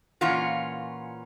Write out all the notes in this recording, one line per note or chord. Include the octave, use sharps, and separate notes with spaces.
A#2 E3 C#4 F4 F#4